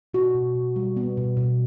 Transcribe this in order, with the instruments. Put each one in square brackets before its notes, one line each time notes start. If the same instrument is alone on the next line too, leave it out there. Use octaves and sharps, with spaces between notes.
[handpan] B2 F#4
B2
B2
G3
B3
B2
B2